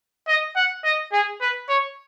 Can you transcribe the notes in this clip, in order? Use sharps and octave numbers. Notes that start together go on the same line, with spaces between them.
D#5
F#5
D#5
G#4
B4
C#5